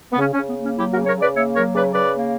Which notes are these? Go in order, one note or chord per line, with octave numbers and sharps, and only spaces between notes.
B3
C#3 C#4
C#4
C#3
B3
A#3 C#4
F#3 E4 G4
F#4 A#4
C#3
A#4 C#5
C#3 B4 D5
A#3 C#5 E5
F#3 A#4 C#5
C#3 B4 D5
C#3 B4 D5
A#3